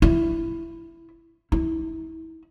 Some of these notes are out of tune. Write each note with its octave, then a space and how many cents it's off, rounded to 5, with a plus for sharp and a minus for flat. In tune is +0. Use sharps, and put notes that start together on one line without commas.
E4 +10
E4 -35